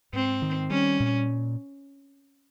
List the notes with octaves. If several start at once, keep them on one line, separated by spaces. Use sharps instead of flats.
G#2 C4
D#3
G3 C#4
A#2